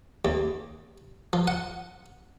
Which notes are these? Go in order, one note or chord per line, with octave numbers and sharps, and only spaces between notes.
D#2
F3
F#5